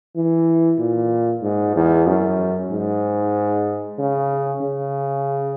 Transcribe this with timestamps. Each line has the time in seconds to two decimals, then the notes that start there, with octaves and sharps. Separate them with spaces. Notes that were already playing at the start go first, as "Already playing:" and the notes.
0.16 E3
0.79 A#2
1.43 G#2
1.76 E2
2.07 F#2
2.71 G#2
3.99 C#3
4.62 C#3